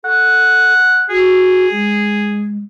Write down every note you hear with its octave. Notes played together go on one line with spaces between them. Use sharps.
A4 F#5
F#4 G#4
G#3